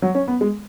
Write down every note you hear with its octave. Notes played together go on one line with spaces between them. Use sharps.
F#3
C#4
B3
G#3